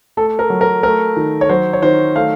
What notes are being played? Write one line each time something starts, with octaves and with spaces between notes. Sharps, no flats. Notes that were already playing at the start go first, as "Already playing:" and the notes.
A3 A4
A#4
F#3
A#4
A3 A#4
D#3
C#5
F#3 C5
C#5
D#3 C5
A3 F5